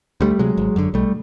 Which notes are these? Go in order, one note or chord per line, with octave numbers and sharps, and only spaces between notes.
D2 G3 A3
C3 F#3 G#3
G#1
F#2 D3
B1 G3 A3